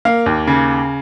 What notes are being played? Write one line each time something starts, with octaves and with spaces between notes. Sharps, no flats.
A#3 F5
D#2
C#3